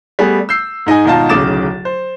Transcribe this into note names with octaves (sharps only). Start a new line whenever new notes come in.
G3 A3 B3 G#4
E6 G6 C7
G#2 D#4 D#5 G#5
G#1 B2 D#4 F4 A5
D1 B1 C#3 D6 A6 E7
C5